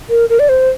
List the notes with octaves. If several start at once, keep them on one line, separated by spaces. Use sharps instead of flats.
A#4
A#4
D5
C5